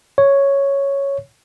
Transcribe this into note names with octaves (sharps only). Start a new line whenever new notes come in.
C#5